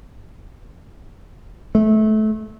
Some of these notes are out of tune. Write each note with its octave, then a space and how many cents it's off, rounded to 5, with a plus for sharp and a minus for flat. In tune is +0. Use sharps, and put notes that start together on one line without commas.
A3 -25